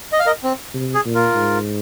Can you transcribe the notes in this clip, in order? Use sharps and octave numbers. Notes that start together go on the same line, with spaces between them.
D#5
F5
A#4 D#5
C4
C3
G#4
A#2
F4 A#4
G#2